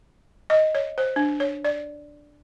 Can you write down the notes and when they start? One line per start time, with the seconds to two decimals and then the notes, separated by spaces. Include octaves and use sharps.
0.50 D#5
0.75 C#5
0.98 C5
1.16 D4
1.40 C#5
1.65 D5